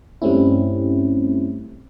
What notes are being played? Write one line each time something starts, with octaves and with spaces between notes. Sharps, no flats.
G2 G3 A3 C4 C#4 E4